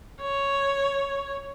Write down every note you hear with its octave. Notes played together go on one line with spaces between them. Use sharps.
C#5